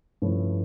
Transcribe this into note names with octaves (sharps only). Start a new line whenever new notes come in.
G2 F3 A3 C#4 E4